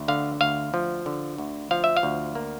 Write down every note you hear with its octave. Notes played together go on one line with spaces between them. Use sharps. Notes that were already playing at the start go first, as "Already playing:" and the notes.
Already playing: D2
D3 F5
D2 F5
F3
D3
D2
F3 F5
E5
F5
D2
A#3